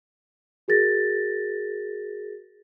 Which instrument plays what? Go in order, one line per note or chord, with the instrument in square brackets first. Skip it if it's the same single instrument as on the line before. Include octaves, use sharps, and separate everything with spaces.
[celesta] F#4 G#4 A#4 A6 A#6